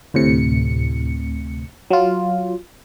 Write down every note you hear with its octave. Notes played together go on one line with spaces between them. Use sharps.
D2 A2 C3 C#7
F#3 F4